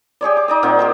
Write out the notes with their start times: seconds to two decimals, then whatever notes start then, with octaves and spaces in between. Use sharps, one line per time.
0.21 G4 G#4 C#5 D5
0.37 D6
0.48 D#4 D5 D#5
0.63 A#2 D#3 C4 F#5
0.79 G4 A#4 C5